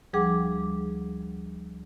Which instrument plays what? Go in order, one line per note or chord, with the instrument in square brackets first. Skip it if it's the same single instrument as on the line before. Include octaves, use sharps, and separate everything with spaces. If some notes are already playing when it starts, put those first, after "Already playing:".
[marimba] D2 F3 G3 G#4 F#5 D6